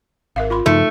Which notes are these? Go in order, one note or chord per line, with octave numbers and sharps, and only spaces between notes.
G#1 A#4 E5 F5
F4 B5 C6
G2 C#3 F3 A3 D#4